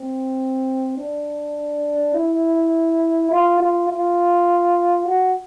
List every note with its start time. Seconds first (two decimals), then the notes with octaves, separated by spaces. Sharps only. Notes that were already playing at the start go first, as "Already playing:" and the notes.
Already playing: C4
0.97 D4
2.14 E4
3.31 F4
3.60 F4
3.89 F4
5.07 F#4